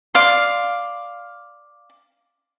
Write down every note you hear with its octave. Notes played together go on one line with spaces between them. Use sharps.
D5 F5 C6